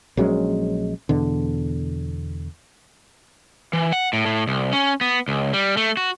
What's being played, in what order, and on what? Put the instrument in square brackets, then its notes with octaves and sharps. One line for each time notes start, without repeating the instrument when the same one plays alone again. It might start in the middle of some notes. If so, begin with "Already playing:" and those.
[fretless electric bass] A#1 F#3 G#3 C#4
E2 B2 D3
[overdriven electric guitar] E3
F#5
A2
A2
C2
C#4
B3
C#2
G3
A3
F#4